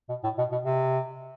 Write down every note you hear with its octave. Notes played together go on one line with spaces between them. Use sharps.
B2
A2
B2
B2
C3